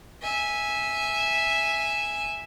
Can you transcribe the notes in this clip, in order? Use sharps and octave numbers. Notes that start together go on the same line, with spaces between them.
E5 G#5